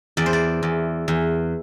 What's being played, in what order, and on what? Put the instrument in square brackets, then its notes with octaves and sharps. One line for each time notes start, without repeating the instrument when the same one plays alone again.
[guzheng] E2 D5
C5
D5
E2
E2